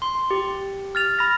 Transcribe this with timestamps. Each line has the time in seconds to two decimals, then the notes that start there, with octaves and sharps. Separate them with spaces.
0.02 C6
0.31 G4
0.95 F6 A6 F7
1.19 B5 F6 A#6